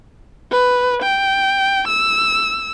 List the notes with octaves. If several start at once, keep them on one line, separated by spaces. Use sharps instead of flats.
B4
G5
E6